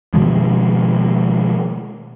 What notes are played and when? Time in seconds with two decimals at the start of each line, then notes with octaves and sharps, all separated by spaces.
0.14 B2 D#3 F3 G#3